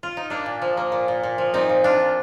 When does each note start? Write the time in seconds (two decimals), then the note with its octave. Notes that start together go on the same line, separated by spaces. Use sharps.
0.03 F4
0.17 D#4
0.30 A#3 D4
0.46 A#2
0.62 F3
0.77 A#3
0.92 A#2
1.08 A#2
1.23 A#2
1.38 F3
1.54 A#2 C4 D#4
1.69 A#2
1.84 A#2 D4 F4
2.00 A#2